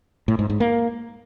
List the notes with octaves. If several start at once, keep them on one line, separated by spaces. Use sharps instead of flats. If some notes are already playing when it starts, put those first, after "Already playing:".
A2
G#2
G#2
A#3